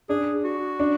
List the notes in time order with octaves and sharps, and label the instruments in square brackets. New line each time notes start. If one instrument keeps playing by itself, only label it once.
[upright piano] D4 [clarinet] G#4
[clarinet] F#4
[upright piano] D4